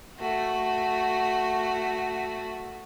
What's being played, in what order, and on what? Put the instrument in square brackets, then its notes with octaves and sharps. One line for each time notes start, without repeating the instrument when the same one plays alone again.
[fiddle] A3 F#4